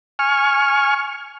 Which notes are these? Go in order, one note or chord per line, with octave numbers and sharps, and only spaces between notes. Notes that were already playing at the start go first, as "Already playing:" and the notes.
G#5 C#6 F6